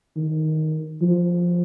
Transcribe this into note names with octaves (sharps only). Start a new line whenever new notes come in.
D#3
F3